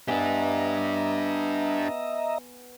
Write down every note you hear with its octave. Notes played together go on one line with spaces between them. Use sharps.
B3 D4 G4 D#5 E5 G#5 A#5